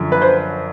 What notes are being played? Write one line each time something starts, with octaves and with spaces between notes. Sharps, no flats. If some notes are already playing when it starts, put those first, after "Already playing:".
Already playing: F#2 D3 F3
B4
C5